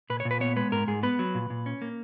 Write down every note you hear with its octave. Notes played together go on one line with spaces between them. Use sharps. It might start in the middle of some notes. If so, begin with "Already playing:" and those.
A#2 B4
C#5
A#2
B4
B3 C#5
G#3 B4
G#2 A#4
G#2 G#4
B3 B4
F#3
A#2
A#2
C#4
A#3